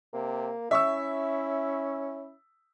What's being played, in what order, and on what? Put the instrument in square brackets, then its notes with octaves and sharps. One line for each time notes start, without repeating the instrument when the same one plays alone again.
[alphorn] C3 [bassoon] A#3
[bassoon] C#4 [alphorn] E4 [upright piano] E5 C#6 E6